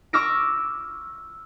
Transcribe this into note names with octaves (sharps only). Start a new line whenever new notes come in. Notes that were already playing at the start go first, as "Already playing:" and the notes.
C#6 D6 E6 F6 A#6 D7